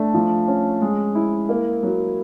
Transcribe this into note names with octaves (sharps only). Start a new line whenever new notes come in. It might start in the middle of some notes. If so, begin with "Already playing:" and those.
Already playing: A3 D4
F3
C#4
G#3
E4
A#3
F#3